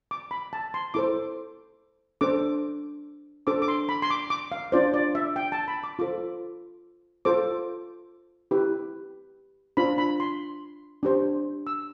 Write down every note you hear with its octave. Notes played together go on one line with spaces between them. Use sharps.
D6
B5
A5
C6
E4 A4 C5 D6
D4 A4 C5 D6
D4 A4 C5 D6
D6
C6
B5
C6
D6
D6
F5
D4 F4 C5 D5
D5
E5
G5
A5
B5
D6
F4 A4 C5 D6
F4 A4 C5 D6
E4 G4 B4
D4 F4 C5 B5
B5
C6
D4 G4 C5
E6